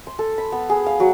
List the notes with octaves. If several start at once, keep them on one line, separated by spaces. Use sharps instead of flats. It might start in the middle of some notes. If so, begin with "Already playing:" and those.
C6
A4
B5
B3
G#4
F5
F#3